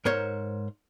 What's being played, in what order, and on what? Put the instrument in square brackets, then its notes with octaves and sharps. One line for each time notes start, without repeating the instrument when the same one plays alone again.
[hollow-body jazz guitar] G#2 A#4 C5 C#5